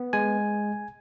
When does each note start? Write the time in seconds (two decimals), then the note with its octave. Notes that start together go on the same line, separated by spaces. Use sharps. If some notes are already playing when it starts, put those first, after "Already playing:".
Already playing: B3
0.13 G#3 G#5